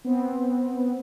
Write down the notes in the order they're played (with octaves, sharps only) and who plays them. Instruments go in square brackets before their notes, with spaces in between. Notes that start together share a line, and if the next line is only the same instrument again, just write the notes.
[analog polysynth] B3 C4